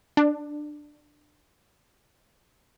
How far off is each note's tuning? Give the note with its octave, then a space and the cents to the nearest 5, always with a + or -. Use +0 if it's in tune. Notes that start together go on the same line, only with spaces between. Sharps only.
D4 +15